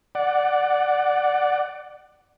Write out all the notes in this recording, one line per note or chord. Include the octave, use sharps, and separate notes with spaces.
D5 F#5